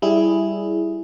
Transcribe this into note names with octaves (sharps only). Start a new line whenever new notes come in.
G3 E4 G#4